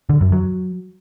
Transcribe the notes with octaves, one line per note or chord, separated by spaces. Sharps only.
D3
F#2
F#3